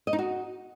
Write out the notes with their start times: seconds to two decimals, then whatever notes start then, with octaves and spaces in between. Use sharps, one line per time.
0.07 D#5
0.13 D#4
0.19 F#4